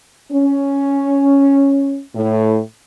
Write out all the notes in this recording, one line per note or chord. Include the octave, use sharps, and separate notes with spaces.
C#4
A2